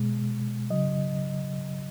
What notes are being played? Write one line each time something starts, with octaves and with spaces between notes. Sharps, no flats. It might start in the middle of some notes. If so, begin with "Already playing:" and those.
Already playing: B2 G#3
C#3 F#3 D#5